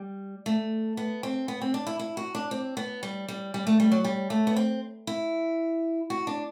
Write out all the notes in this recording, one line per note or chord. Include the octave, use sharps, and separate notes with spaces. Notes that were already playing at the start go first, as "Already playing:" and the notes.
Already playing: G3
A3
B3
C4
B3
C4
D4
E4
E4
F#4
D4
C4
B3
G3
G3
G3
A3
G3
F#3
G3
A3
B3
C4
E4
F#4
D4